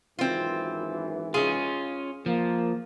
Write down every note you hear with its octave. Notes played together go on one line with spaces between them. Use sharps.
G#1 F#2 E3 C4 F4
C#4 F4 G#4
F3 A#3